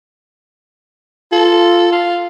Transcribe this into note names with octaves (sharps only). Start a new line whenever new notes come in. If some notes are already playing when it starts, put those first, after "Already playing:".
F4 A4
F4